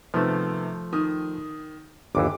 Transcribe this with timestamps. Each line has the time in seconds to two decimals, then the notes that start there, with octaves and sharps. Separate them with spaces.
0.14 C3 D#3 F3 A3 B3
0.93 D#3 D#6
2.15 G1 D#2 E3 D6